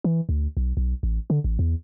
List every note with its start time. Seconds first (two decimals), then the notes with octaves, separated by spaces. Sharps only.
0.04 E3
0.29 D2
0.57 B1
0.77 B1
1.03 A1
1.30 D3
1.44 A1
1.59 E2